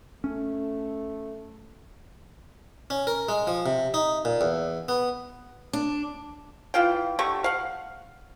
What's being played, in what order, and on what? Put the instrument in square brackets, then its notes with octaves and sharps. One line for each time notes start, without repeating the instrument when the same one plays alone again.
[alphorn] A3 [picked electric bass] C#4
[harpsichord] C#4
A#4
G#3
F3
C3
D#4
A#2
E2
B3
[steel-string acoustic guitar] D4
[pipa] E3 F4 F5 G5
D3 A3 G4 C#6
F5 F#5